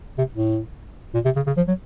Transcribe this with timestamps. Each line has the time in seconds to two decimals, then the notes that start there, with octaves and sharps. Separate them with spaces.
0.18 C3
0.34 A2
1.14 A#2
1.25 C3
1.36 C#3
1.47 C#3
1.57 F3
1.68 F#3